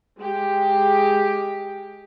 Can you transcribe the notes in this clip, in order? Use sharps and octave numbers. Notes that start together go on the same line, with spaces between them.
G#3 G4